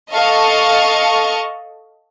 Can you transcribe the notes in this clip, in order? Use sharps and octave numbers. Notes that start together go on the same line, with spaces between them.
A4 D#5 F5 A5 C#6